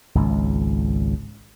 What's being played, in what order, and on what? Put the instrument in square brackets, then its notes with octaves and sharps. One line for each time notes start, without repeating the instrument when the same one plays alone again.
[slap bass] G#1 C#2